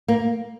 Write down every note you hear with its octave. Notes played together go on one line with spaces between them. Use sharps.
A#3